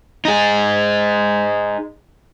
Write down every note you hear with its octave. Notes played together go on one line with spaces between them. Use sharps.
D#4 G#4